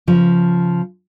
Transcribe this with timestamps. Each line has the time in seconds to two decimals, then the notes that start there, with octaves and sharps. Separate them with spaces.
0.07 C#3 F3 F4